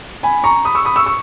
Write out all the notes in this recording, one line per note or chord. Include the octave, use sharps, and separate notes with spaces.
G#5 B5
A#5 C#6
B5 D#6
C#6 E6
B5 D#6
C#6 E6
C#6 E6